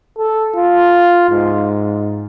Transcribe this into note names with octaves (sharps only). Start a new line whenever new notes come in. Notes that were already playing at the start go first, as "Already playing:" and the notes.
A4
F4
G#2